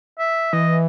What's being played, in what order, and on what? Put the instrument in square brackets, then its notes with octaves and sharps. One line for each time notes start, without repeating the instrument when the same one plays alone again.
[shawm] E5
[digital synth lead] E3 [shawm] D#5